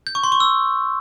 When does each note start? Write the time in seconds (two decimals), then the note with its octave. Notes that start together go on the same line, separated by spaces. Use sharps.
0.07 G6
0.15 C#6
0.23 C6
0.32 C#6
0.40 E6